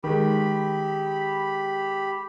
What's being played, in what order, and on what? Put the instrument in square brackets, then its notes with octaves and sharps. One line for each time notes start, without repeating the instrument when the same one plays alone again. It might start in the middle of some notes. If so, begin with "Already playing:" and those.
[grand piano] D#3 G#3 [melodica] G4 B5